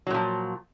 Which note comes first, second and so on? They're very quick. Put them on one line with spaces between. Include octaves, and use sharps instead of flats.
F#3 A#2 F3